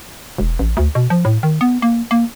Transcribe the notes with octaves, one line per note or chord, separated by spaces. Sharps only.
E1
A1
D2
B2
F3
A2
D#3
B3
A#3
A#3